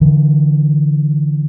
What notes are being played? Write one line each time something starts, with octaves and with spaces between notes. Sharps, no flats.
D3 E3